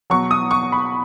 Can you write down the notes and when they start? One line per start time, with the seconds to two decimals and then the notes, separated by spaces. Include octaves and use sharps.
0.10 E2 B2 F#3 C#6
0.31 D#6
0.51 C#6
0.72 B5